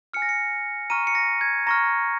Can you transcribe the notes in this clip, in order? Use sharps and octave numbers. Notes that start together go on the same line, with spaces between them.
G#5 F6 C#7
A#6
C#7
A#5 C#6 F6 D#7
C#7
A#6
G#6
A#5 C#6 F6 A#6